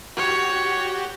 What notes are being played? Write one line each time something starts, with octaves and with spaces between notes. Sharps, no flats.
F#4 G4 C#5